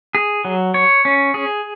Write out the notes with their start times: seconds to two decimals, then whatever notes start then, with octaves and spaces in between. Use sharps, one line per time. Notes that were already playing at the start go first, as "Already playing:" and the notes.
0.15 G#4
0.45 F#3
0.74 C#5
1.05 C#4
1.34 G#4